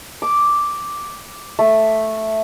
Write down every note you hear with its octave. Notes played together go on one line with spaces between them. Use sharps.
D6
A3